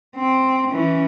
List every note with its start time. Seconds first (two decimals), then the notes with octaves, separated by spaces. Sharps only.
0.16 C4
0.72 E3 C#4